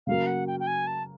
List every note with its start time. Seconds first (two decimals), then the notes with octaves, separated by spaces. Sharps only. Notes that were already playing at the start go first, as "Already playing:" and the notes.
0.07 C#3 F#3 A#3 F5
0.27 F#5
0.47 G5
0.60 G5
0.67 G#5
0.87 A5